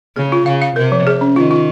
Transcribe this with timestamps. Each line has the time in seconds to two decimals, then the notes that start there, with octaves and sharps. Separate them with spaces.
0.16 C#3 G#4
0.32 F4
0.46 C#3 F5
0.62 F5
0.76 C3 A#4
0.92 F3
1.07 G#4
1.21 C#4
1.36 D#3 F4
1.51 F4